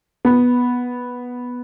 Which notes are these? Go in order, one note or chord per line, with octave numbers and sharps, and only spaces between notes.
B3